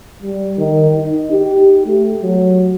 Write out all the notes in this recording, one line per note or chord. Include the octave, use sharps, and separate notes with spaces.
G3
D#3
D#4
G4
A3
F#3